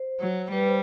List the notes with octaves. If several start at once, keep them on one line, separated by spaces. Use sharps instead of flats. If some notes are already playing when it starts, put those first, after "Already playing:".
Already playing: C5
F#3
G3 B4
C5